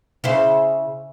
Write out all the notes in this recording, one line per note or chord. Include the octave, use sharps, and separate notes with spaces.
C#3 E4 C5